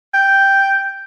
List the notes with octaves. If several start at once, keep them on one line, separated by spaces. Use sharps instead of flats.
G5